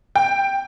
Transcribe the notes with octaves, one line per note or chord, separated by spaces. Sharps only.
G5